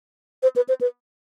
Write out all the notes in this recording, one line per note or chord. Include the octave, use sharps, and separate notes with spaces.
C5
B4
C5
B4